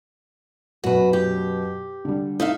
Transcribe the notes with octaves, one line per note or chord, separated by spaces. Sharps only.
F#2 B2 F#4 B4
G4
D3 G3
D#4 E5 F5